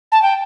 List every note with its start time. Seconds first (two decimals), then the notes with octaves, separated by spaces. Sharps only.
0.12 A5
0.22 G5